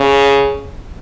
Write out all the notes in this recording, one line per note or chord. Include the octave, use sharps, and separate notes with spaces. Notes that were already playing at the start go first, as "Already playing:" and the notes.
Already playing: C#3